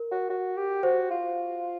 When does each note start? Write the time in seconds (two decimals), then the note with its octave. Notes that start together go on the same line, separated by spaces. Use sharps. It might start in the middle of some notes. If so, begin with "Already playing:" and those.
Already playing: A#4
0.12 F#4
0.30 F#4
0.57 G4
0.83 F#4 C5
1.11 F4